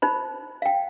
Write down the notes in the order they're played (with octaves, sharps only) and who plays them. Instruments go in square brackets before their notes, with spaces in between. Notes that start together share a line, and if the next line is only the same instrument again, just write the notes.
[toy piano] D#4 C5 B5
F5 G5